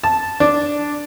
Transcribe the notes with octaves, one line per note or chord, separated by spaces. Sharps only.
A5
D4